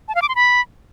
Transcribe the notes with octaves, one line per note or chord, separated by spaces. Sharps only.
A5
F5
D6
C6
B5